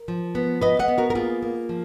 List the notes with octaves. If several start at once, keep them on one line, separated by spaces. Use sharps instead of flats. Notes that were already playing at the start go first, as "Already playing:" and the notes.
Already playing: A#4
F3
B3
B3 B4 D#5
D#5 F#5
B3
F#4 A#4
A#4
A#3 F4 G#4
A#3
F3